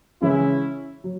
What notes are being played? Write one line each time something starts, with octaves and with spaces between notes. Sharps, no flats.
C#3 E3 G#3 C#4 E4
F#3